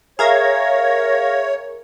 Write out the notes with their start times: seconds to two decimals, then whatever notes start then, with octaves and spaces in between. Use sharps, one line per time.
0.19 G#4 A#4 C#5 E5 F5 G#6 A#6